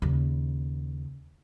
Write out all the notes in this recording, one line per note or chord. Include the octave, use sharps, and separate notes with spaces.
D#2 C#3